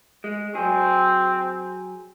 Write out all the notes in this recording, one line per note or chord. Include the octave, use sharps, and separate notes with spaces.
G#3
F#3 C4 G#4